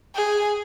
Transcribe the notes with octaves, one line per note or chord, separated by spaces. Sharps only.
G#4